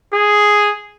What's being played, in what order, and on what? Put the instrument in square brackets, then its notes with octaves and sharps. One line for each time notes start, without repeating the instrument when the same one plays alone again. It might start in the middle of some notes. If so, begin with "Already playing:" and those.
[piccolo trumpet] G#4